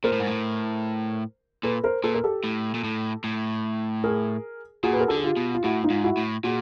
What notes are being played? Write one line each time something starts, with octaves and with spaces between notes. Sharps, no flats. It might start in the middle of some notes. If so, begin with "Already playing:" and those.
A#2 A#4 C5
A2
G#2
A2
A#2 A4 B4
A#4 C5
A#2 A4 B4
A#4
G4 A4
A2
A#2
A2
A2
G#4 A#4
A#2 F#4 G#4
B4
A#4
A4
D3
G#4
F4 G4
B2
F4
A2 E4 F#4
D#4 F4
G#2
E4 F#4
A2
A#2 F#4 G#4